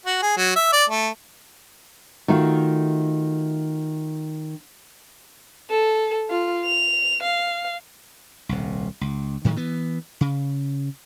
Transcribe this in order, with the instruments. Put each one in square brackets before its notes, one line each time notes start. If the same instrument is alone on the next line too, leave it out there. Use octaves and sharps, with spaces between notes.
[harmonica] F#4
G#4
F#3
E5
D5
A3
[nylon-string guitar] D#3 A3 F4 F#4
[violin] A4
F4
F7
F5
[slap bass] D#1 C2
C#2
A2 D#3 F#3 G#3
E3 B3
C#3